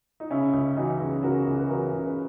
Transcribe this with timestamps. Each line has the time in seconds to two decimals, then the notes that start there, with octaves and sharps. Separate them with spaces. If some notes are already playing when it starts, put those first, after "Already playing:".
0.20 D#4
0.31 C#3 C#4 E4
0.53 C#2
0.76 E3 D#4 F#4
1.01 C#2
1.23 C#3 F#4 A#4
1.47 C#2
1.59 B4
1.70 E3 F#4 A#4
1.93 C#2
2.05 B4